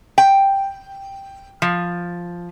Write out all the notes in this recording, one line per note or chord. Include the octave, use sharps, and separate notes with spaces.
G5
F3